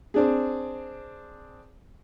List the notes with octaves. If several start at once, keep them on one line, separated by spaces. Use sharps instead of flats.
C4 D4 G#4